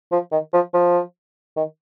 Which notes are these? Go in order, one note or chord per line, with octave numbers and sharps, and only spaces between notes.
F3
D#3
F3
F3
D#3